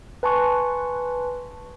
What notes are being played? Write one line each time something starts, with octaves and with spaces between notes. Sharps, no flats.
B4 G#5 A5 C6 C#6 F#6